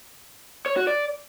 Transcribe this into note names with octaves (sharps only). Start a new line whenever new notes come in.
C#5
F#4
D5